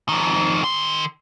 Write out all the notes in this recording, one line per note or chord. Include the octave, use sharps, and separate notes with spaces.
F2 D#3
D#3 C6